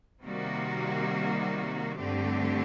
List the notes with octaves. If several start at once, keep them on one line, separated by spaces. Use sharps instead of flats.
C3 D#3 G3 A#3 F#4
G2 D3 A3 C4 G4